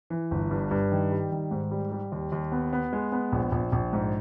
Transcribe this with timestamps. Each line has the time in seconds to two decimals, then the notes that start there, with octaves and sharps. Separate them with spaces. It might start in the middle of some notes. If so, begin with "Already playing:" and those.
0.10 E3
0.31 G1
0.51 G2
0.71 G2
0.92 D#3
1.12 G3
1.32 D#3
1.51 G#2
1.71 G3
1.92 G3
2.12 D#2
2.32 D#2
2.52 B3
2.73 B3
2.93 G#3
3.12 B3
3.32 A#1
3.52 A#1
3.72 A#1
3.93 G#2